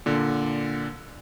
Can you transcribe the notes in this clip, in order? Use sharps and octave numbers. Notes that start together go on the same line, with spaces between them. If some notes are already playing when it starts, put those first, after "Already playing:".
A#2 D3